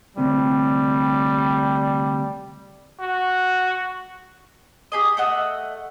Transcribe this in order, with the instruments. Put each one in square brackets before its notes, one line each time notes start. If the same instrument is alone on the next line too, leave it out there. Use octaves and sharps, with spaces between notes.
[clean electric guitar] D2 C3 [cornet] G3
[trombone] F#4
[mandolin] G4 G#4 D#5
A3 D#5 F#5 E6